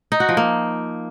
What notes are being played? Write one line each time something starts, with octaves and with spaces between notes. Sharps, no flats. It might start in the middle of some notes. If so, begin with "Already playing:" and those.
D#4
F#4
F3
A#3